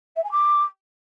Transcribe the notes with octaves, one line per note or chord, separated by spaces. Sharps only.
E5
G#5
D6